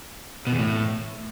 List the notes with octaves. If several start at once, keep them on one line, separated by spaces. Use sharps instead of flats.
B2
E2
A2